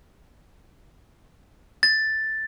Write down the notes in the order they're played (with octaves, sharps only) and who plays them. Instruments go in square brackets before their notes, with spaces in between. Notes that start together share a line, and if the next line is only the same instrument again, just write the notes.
[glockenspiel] A6